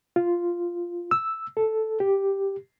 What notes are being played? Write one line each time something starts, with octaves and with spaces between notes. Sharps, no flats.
F4
E6
A4
G4